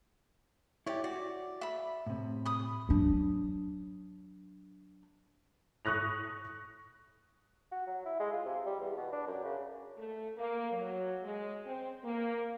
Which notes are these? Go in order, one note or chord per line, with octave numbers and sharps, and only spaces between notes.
E4 G4 C#5 D5
F#4 D5
E5 B5
A2 C3
B5 D#6
F#3 D4
C#6 D#6 F#6 A#6 F7
F#4
F#3
E4
G#3
F4
C3
G3
E2
B2
D4
F#2
C#3
A3
A#3
F#3
G#3
C4
A#3